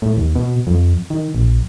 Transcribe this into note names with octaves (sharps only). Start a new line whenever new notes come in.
A2
D#2
B2
F2
D#3
A#1